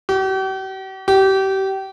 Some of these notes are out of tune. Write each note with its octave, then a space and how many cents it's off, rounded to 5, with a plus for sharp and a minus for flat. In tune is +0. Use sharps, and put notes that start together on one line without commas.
G4 -45
G4 -30